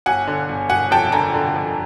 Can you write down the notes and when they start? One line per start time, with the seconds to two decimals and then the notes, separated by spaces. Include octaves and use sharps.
0.06 G1 F#5 G#5
0.27 D3
0.49 G1
0.70 G1 F#5 G#5
0.91 F2 G5 A5
1.12 D3 G#5 A#5
1.34 D3
1.55 F2